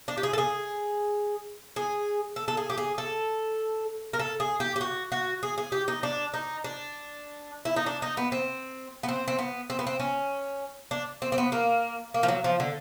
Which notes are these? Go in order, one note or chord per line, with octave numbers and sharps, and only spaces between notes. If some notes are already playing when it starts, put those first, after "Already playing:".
D4
G4
G#4
A4
G#4
G#4
A4
A4
G#4
G4
G#4
A4
A#4
A4
G#4
G4
G4
F#4
F#4
G#4
G#4
G4
D#4
D4
D#4
D4
E4
D#4
D4
D#4
B3
C4
B3
C4
C4
B3
C4
B3
C4
C#4
D4
C4
C4
B3
A#3
A#3
F3
F#3
F3
D3